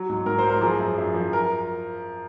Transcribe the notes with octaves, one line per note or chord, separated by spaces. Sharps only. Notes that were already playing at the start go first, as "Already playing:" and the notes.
Already playing: F#3
G#2
G#2 A#4
C5
F#3
A#4
F3 G#4
F#2
F#2
F3
A#4